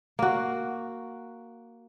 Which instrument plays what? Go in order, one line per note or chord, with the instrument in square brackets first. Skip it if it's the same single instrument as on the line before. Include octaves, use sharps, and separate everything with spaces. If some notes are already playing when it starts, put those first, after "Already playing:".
[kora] A#3 F#4